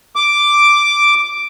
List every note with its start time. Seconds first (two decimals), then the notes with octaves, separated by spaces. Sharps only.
0.16 D6